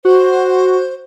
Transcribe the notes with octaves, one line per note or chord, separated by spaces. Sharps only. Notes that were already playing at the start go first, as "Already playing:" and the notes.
F#4 C5